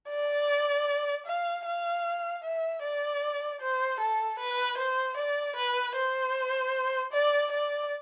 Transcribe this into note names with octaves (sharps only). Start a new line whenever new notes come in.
D5
F5
F5
E5
D5
C5
A4
B4
C5
D5
B4
C5
D5
D5